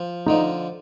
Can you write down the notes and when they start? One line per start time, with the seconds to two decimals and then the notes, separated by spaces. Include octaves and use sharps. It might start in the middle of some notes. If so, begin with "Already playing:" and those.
Already playing: F3
0.26 D3 F3 D#4